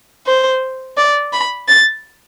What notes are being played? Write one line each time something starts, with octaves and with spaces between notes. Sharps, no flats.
C5
D5
B5
A6